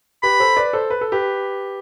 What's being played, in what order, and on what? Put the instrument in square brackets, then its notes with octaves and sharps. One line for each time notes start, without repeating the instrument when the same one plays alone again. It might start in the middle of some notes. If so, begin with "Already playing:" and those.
[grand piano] G4 B4 [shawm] B5
[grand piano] A4 C5
B4 D5
A4 C5
B4
A4
G4 B4